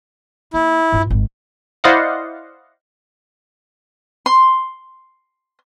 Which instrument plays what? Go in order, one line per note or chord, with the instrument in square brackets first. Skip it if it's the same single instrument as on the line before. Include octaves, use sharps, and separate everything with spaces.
[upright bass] A#3 [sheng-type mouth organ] E4
[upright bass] G2 F4
G#1
[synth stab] E4 C5 D5 D#5 F5 F#5
[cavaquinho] C6